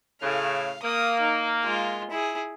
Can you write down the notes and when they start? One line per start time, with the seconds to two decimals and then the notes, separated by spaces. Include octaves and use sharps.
0.22 A2 C#3 F5
0.83 A#3 D#6
1.20 D#4
1.64 G#3 F4
2.11 E4 G#4